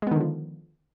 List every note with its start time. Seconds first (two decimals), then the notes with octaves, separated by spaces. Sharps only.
0.02 G#3
0.07 B3
0.11 D#3
0.16 D3
0.20 F3